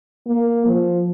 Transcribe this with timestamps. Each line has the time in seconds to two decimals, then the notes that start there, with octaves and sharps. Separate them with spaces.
0.27 A#3
0.66 F3